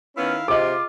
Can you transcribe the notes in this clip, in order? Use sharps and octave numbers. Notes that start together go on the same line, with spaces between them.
D#3 B3 C#4 E4 F5
C3 F4 G#4 D#5 D6